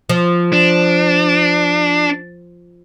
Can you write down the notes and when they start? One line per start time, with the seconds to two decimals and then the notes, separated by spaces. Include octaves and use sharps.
0.09 F3
0.53 D4